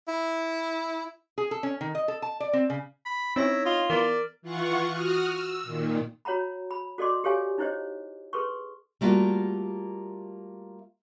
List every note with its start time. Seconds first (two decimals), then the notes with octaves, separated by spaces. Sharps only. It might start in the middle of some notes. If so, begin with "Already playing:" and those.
0.08 E4
1.38 G#4
1.51 A4
1.63 C#4
1.81 D#3
1.95 D#5
2.08 A4
2.22 A5
2.40 D5
2.53 C4
2.70 C#3
3.05 B5
3.36 C4 C#4 D#4 E4 C#5 E5 A#6
3.66 F4 D#5
3.90 E3 B3 A#4 D5
4.42 E3 F4 F#5 C#6
4.91 F#4 D#6 F6
5.32 E6
5.64 A#2 D#3
6.25 F#4 C#5 F#5 A#5 B5
6.71 B5
6.98 F#4 A4 D5 D#5 C6 D6
7.24 G4 A4 C#5 F5 G#5
7.58 D#4 E4 C5 C#5 D#5
8.33 G#4 A4 B4 C6 C#6
9.01 G3 A3 A#3 F4 F#4